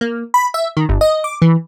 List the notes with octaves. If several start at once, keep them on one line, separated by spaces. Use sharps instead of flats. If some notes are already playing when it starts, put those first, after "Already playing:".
A#3
B5
E5
D#3
G1
D#5
D6
E3